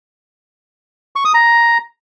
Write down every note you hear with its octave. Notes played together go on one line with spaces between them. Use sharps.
C#6
D#6
A#5